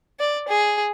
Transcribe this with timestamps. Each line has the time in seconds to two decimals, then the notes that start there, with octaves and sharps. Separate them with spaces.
0.20 D5
0.48 G#4